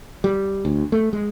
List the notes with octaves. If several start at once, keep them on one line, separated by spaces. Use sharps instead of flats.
G3
D2
A3
G#3